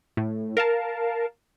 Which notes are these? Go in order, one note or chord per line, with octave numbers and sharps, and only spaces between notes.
A2
A#4 F5 A5